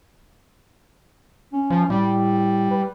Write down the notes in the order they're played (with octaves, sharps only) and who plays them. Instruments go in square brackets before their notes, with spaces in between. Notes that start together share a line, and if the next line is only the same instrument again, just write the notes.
[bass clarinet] C#4
[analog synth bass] F3
[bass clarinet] A2 [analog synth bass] G3
[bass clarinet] B4